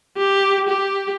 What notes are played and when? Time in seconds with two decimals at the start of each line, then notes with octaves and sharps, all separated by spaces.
0.17 G4
0.68 G4